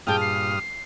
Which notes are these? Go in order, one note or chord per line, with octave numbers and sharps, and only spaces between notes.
G2 A#2 G#4 G5 A5 D#6 F6
C7